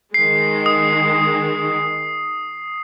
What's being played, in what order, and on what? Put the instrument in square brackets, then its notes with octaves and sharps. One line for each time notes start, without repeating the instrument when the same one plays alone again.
[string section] D#3 G#3 [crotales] C7
[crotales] D#6